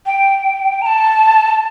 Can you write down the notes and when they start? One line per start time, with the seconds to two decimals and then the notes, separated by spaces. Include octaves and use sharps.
0.06 G5
0.82 A#5
0.86 A5